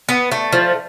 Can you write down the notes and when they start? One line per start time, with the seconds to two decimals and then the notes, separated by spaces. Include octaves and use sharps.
0.09 B3
0.32 A3
0.52 F3